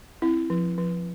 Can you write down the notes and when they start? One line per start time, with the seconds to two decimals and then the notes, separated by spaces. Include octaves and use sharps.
0.22 C4 E4
0.50 F3
0.78 F3